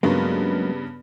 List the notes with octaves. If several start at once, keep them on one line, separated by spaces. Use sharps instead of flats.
G2 C#3 F#3 G#3 A#3 B3